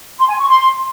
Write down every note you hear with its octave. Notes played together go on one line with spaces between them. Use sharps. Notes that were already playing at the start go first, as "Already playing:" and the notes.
C6
G#5
C#6
C6